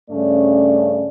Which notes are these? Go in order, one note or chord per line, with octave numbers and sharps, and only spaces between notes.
G2 C#3 A3 C#4 D5